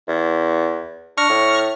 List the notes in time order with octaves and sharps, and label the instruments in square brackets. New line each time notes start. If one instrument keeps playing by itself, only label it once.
[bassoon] E2
[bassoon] D4 [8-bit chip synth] C#6 F6 A#6
[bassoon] A2